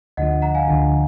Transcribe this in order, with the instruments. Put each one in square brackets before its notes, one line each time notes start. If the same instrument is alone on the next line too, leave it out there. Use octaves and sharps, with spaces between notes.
[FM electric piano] D2 D3 F3 [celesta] D#5 F#5
[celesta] F#5 A#5
F5 G#5
[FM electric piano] D2 D3 F3